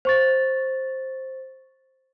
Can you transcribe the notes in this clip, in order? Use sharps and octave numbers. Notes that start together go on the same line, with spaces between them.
C5 C#6 A6